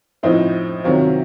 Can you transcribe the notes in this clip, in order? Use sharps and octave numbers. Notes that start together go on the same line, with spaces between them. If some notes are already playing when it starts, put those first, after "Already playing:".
A2 F3 C4 D#4
C3 D#3 F#3 C4 F4